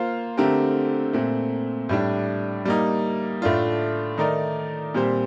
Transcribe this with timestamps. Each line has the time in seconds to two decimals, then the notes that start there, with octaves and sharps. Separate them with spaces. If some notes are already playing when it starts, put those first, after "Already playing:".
Already playing: A#3 F4 C5 F5
0.37 D3 A3 C4 G4 A#4
1.13 A#2 A3 C4
1.89 A2 G3 D4
2.65 G3 A#3 D#4
3.42 A2 A3 D4 F4
4.17 D#3 A3 D#4 A#4 D5
4.94 A#2 G3 C4 G4 C5